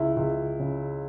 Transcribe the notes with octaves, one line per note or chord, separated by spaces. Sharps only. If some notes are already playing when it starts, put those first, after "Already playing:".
Already playing: C#2 E4
C#2
C#3